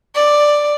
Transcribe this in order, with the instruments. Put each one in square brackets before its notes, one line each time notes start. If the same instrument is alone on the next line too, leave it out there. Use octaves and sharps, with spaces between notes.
[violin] D5